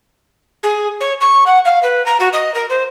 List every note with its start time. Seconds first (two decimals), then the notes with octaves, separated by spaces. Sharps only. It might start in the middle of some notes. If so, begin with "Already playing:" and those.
0.63 G#4
1.01 C#5
1.21 C#6
1.46 F#5
1.65 F5
1.83 B4
2.06 A#5
2.20 F#4
2.33 D#5
2.54 A#4
2.70 C5